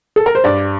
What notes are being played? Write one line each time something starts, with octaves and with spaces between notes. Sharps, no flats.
A4
A#4
C5
G2 D5